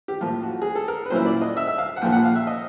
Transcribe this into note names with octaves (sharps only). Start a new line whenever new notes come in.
G4
A2 F3 A#3 F4
F#4
G#4
A4
A#4
B4
A#2 F#3 A#3 C#4 E4 C5
D5
D#5
E5
E5
F5
F#5
A#1 A#2 F3 A#3 G5
F#5
F5
E5
D#5